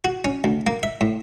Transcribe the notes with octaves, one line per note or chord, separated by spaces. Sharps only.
F#4
C#4
D2
A#3
E5
A2